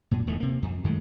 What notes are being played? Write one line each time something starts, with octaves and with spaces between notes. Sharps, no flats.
F#2 A#2
D1 E2 D#3 A3
C3 A#3
F2
F#2 D#3 G#3 A3